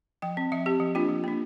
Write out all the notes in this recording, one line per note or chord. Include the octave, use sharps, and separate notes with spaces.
F3 G5
C4
F3 E5
C4 G4
F3
A#3 D4 F4
F3
A#3 D4